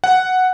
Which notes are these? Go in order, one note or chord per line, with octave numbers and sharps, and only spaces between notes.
F#5